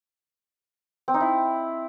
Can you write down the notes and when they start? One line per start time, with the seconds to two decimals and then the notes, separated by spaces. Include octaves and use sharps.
1.08 C4
1.14 D#4
1.20 E4